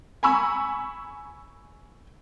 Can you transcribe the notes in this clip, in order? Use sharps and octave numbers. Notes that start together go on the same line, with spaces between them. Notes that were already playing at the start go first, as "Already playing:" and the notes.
G#5 A#5 B5 C#6 E6